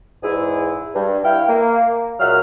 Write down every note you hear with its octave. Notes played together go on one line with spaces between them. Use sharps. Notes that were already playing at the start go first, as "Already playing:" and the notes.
E2 G#2 E4 G#4
G2
E4 F5 G5
A#3
C#2 A#2 F#3 E5 F#5 F6